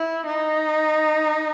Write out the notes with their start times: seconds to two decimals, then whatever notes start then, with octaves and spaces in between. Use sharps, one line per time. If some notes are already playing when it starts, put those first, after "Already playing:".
Already playing: E4
0.26 D#4